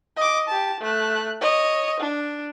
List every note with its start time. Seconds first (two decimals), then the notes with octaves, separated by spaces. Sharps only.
0.17 D#5 D6
0.48 G4 A5
0.80 A3 F#6
1.41 C#5 D#5
2.00 D4